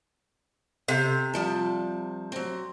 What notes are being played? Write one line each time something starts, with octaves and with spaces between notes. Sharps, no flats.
C3
F3 G3 A5
F#3 C4